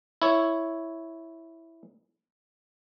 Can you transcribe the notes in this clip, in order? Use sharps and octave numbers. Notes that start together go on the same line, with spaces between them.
E4 C#5